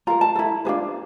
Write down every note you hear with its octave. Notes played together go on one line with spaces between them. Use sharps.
F4 A#4 A#5
A5
E4 A4
D4 F4 G#4 B4